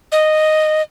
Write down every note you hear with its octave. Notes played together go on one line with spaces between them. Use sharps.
D#5